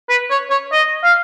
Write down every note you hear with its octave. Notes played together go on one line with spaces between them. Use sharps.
B4
C#5
C#5
D#5
F5